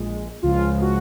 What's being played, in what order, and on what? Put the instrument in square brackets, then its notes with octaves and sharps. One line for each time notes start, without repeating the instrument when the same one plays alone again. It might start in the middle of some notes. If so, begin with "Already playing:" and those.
Already playing: [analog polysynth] A#1 A#2 G#3
C#2 C#3 F3 G#3 F4
F#4